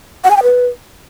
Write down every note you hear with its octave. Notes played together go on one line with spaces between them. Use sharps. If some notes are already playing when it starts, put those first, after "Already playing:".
F#5
G#5
G5
B4